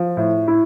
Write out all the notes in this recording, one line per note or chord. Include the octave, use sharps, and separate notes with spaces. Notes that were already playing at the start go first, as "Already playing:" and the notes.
Already playing: F3
A2
E4